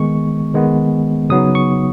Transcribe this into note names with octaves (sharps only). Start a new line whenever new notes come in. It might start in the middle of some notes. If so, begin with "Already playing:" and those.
Already playing: D#3 G#3 B3 C#6
D#3 G#3 B3
C#3 F#3 B3 D#4 D#6
C#6